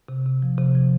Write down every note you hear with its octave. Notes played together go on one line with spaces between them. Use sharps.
C3
C3
F3
C3
F3